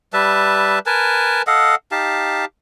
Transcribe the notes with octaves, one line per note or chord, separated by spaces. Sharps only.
G3 B4 E5 A5
A#4 B4 G#5 A5
A4 D#5 F5 F#5
D#4 G4 F5 A5